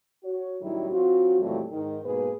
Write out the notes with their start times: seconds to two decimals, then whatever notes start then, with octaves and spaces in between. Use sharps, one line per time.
0.23 F#4 C#5
0.61 F#2 A2 D#3 F#3 G3 E4
0.91 F#3 C4 F4 F#4
1.39 F2 A#2 E3 F#3 G3 A3
1.70 G#2 D#3
2.03 G#2 B2 A#3 G#4 B4